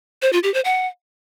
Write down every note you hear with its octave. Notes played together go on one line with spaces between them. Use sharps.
C5
F4
G4
C5
F#5